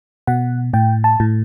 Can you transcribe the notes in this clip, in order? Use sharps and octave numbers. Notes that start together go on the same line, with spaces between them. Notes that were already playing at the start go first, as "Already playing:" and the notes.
B2 F#5
A2 G5
A5
A2